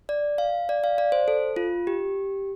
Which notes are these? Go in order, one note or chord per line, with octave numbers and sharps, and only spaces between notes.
D5
F5
D5
F5
D5
C5
A4
F4
G4